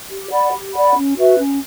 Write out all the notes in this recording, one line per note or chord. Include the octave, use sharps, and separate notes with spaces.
G4
D5 F#5 B5
G4
D5 F#5 B5
C#4
F#4 B4 E5
C#4